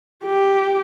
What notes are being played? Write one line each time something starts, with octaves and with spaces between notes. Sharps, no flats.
G4